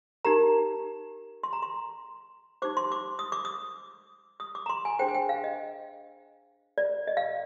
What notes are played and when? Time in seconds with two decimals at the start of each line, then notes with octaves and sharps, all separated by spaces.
0.25 D#4 G4 A#4 A#5
1.43 C6
1.53 A#5
1.62 C6
2.62 D#4 G4 C5 D6
2.77 C6
2.92 D6
3.19 D#6
3.32 D6
3.45 D#6
4.40 D#6
4.55 D6
4.66 A#5
4.69 C6
4.85 G#5
4.99 D4 G#4 C5 G5
5.08 G#5
5.14 G5
5.29 F5
5.44 D#5
6.78 D5
7.08 D#5
7.17 F5